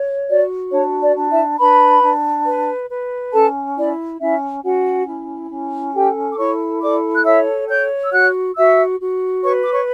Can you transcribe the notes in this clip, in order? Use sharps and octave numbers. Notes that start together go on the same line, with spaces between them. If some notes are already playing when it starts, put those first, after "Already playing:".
Already playing: C#5
F#4 D5
D4 C#5
D5
D4
E4 E5
D4 B4 B5
D4
B4
B4
C#4 A4 A5
E4 D5
C#4 E4 E5
C#4 F#4 F#5
E4
C#4
G4 A4 G5
D6
E4 C#5 C#6
A4 D5 D6
F#6
C#5 E5 E6
C#5 G5 G6
E6
F#4 F#5 F#6
F#4 E5 E6
F#4
B4 C#5 C#6
D6
C#5 C#6